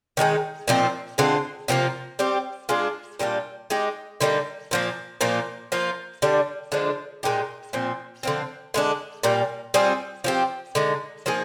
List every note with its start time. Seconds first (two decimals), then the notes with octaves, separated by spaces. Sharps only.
0.17 D#3 G#3 D#4 G#4
0.68 A#2 F3 C4 D#4
1.18 D3 G#3 C4 F4
1.68 C3 F3 A#3 F4
2.19 G3 C4 G4
2.69 G#3 D4 F4 G#4
3.19 A#2 G3 D4 F4
3.70 G#3 D#4 G4
4.20 D3 G3 A#3 D#4
4.71 A#2 F3 A#3
5.21 A#2 F3 A#3 F4
5.72 F3 A#3 F4
6.22 D3 G3 D4
6.72 D3 F3 G#3 D4
7.23 A#2 G#3 D#4 G4
7.73 A#2 F3 C4
8.23 D3 F3 C4
8.74 D3 G#3 D4
9.23 A#2 G3 A#3
9.74 G3 C4 F4 G#4
10.24 F3 C4 G4
10.75 D3 G#3 D#4
11.26 F3 A#3 D#4 G#4